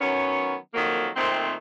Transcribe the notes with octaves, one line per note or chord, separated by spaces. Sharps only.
D#3 F#3 B3 C#4
F2 D#3 F#3 A#3
A#2 D#3 A3 C4